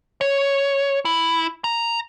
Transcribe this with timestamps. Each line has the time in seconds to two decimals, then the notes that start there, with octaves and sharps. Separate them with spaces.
0.21 C#5
1.05 E4
1.64 A#5